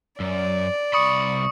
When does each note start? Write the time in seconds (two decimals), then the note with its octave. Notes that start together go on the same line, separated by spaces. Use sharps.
0.20 F#2 D5
0.93 C2 B5 C#6 D#6 C#7